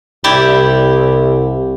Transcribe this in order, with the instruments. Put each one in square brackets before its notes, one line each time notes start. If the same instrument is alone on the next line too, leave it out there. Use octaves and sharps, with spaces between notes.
[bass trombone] C2 [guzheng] E4 G4 D5